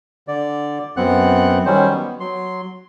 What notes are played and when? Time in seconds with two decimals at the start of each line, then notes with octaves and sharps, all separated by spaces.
0.28 D3 D5
0.97 F#2 B3 C4 F#5 F#6
1.66 D#3 F#3 G3 C#4 C5
1.94 B3
2.20 F#3 C6